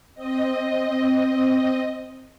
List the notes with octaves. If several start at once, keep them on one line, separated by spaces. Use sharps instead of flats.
C4 D#5